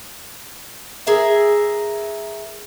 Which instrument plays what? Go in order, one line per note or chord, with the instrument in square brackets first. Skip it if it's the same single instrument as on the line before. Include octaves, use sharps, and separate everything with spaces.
[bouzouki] G#4 A#4 E5